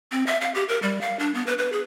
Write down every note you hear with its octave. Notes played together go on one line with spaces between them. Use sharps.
C4
E5
F5
G4
A#4
G3
F5
D4
B3
B4
B4
G#4